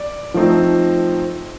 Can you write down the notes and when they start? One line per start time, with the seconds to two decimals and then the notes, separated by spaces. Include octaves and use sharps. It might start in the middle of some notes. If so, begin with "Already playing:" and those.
Already playing: D5
0.34 F3 A3 C4 D#4